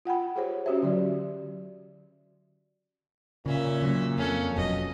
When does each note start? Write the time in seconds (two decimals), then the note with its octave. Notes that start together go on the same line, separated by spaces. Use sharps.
0.05 F4 F#5 G5 B5
0.36 G4 G#4 C5 C#5
0.66 C#4 F#4 G4 C5 E5
0.83 D3 F#3 D5
3.46 A#2 C#3 C#4 E5
3.82 C#3 F#3 A#3
4.18 F2 C#4 A4
4.56 F1 F#2 B2 D#5